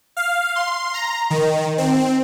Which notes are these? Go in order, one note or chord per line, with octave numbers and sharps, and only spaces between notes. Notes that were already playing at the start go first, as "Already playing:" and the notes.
F5
C6
A#5
D#3
C4